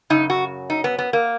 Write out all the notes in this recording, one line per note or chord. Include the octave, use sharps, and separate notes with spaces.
F#2 C#3 D#4
F#4
D#4
B3
B3
A#3